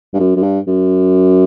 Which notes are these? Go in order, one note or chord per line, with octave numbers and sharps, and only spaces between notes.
G2
F#2
F#2
G2
F#2